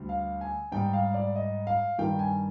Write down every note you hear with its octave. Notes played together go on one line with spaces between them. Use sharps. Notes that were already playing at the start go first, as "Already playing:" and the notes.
Already playing: D2 D3 G3
F5
G#5
G#2 G3 G5
F5
D5
D#5
F5
G2 D#3 G3 G5
G#5